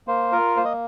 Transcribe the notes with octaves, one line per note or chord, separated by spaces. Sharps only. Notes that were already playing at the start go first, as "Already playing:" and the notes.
A#3 C5
F4 A#4
A#3 C5
D#5